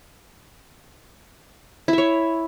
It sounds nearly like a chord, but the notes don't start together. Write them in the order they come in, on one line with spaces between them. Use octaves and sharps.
E4 E5 C#5